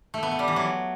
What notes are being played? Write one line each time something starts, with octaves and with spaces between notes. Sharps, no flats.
A3
B3
A3
G3
E3
F#3